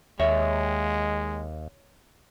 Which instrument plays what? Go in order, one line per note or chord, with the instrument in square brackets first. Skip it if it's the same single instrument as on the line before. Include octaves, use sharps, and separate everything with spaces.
[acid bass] D#2 [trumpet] G#3 [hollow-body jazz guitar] C#5 E5